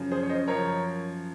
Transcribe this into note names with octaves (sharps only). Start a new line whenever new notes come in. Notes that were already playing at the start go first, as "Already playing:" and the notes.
Already playing: F#2 C#3 F3
G#4 C5
C#5
C5 D#5
F#2 F3 A#4 C#5